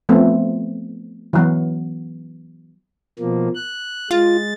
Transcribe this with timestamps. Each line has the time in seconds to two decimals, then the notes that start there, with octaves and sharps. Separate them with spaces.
0.09 F3 A3 B3 C4
1.33 E3 F#3 B3
3.19 B2 F3 A#3
3.55 F#6
4.11 G#3 F4 A6